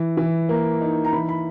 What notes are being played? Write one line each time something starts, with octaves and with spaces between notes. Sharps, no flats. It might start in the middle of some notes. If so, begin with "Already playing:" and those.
Already playing: E3
E3
A#3
D#4
A#5
E3 B5
B5